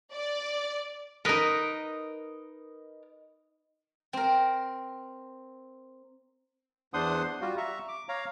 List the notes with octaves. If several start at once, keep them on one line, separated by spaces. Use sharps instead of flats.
D5
D#4 A#4 B4 D#5
C4 A#4
E2 D4 C5 F#5 C6 D#6
G3 F4 F#4
E5 A#5 C#6
D6
C#5 F5 A#5